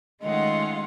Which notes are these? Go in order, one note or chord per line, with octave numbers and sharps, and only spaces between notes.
D#3 G#3 A3 C#4 F4 D#5 F#5